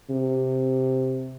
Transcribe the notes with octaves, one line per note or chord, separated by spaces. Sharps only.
C3